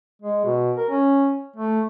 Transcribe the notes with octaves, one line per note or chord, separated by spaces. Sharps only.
G#3
B2
A#4
C#4
A3